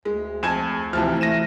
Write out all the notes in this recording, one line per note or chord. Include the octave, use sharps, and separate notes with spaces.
D2 G#3
F2 G#5 A5 G#6 E7
D2 C3 E3 F3 A5 F6
A3 A#6 D#7 E7